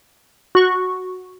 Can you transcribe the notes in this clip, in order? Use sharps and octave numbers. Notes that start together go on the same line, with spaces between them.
F#4 C#6